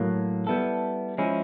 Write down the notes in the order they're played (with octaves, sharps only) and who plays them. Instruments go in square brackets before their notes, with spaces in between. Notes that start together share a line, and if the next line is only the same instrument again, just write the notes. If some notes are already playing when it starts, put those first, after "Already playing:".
Already playing: [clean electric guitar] A2 F#3 A#3
G3 B3 E4 A4
F3 G#3 C#4 E4